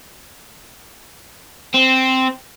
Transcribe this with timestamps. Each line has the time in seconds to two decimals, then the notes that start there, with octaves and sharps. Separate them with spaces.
1.74 C4